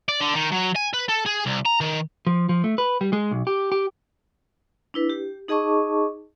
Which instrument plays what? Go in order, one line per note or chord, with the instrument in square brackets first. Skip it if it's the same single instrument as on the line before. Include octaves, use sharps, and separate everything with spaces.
[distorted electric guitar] D5
D3
D#3
F#3
G#5
B4
A4
G#4
C2
A#5
D#3
[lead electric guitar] F3
F3
A3
B4
G3
G#3
B1
G4
G4
[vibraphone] D4 E4 B4
G4
D#4 G#4 D#5 A5 C#6 D6